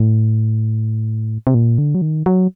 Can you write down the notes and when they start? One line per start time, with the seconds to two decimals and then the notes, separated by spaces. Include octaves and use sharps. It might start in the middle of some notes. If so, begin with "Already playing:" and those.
Already playing: A2
1.47 C3
1.54 A#2
1.78 D3
1.95 F#3
2.02 D#3
2.26 F#3